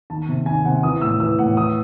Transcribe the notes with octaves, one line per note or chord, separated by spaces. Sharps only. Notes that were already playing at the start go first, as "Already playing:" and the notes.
D#3 A5
C3
D#3 G#5
C3 F#5
E3 D#6
A2 E6
E3 E6
A2 F#5
E3 D#6